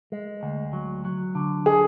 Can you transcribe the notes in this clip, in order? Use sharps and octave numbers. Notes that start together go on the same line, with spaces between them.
G#3
D2
F#3
F#3
D3
G#4